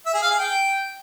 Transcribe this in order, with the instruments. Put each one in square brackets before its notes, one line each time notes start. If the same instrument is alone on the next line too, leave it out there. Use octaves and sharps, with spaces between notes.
[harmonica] E5
G#4
F5
G#4
G5